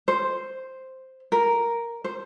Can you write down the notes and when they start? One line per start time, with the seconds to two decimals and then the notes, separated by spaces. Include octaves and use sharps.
0.08 C5
1.32 A#4
2.04 C5